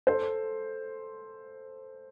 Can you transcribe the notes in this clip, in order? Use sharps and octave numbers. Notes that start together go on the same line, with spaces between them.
A4 C5